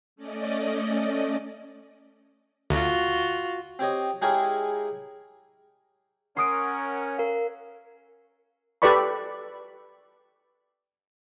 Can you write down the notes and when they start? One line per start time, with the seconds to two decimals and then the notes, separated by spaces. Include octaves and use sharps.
0.16 A3 C#4 D5 D#5
2.70 D2 F4 F#4
3.79 C4 G4 C#5 D#5
4.22 G#3 E4 G4 G#4 A#4 C#5
6.37 C#4 A#4 C#5 F#5 C6 D#6 D7
7.18 A#4 F5
8.82 G4 A4 B4 D5 B5 C#6